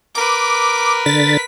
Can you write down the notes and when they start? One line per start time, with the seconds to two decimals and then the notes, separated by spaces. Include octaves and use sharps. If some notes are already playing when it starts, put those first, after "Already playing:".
0.15 A#4 B4 D6
1.06 D3 A6 B6